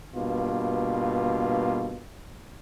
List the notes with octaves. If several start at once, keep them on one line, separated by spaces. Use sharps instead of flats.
G2 B2 A#3 F4